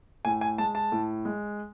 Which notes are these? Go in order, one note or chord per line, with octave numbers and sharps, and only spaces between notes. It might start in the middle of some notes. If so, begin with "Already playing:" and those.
A2 G#5
G#5
G#3 A5
A5
A2
G#3